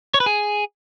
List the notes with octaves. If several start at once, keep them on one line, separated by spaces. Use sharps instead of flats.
C#5
B4
G#4